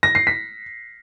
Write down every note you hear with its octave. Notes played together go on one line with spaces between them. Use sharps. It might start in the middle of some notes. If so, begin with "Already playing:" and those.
A#6
C7
B6